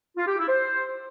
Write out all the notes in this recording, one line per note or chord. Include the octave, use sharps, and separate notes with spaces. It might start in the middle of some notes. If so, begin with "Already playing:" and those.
F4
G4
E4
C5